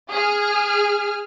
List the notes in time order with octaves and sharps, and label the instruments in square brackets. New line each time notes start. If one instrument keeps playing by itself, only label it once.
[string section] G#4 F6